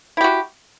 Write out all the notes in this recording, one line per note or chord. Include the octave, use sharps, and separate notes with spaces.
E4 F#4 G4